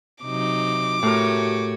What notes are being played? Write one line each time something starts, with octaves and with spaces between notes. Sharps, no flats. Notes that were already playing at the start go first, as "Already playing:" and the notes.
C3 F#3 D#4 D6
A2 F#4 G4 A#4 C#5